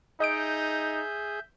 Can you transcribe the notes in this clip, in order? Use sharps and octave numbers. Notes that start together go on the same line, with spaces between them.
D#4 G#4 D#5 E5 D#6 G6 D7